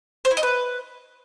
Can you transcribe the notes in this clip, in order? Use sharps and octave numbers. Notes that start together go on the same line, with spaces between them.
C5
E4
D#5
B4